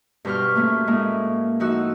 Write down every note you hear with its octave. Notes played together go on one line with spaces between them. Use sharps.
G2 B2 B4 C5 C#6 F6
A3 A#3 C#4
A2 G#3 A#3 C#4
F3 D#4 F#4 F#5 E6